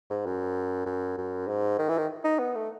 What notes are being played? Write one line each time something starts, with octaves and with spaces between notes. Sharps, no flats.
G#2
F#2
F#2
F#2
G#2
D#3
E3
D#3
D#4
B3
A3